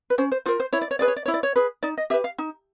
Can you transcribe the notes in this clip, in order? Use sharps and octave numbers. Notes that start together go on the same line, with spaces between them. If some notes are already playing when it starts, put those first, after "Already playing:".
B4
C#4 C5
C5
F4 A#4 C5
C5
E4 C#5
D5
C#5
G#4 B4 D5
C#5
D5
E4 C#5
D5
C#5
G#4 B4
D#4 D5
D#5
G4 B4 E5
F5
D#4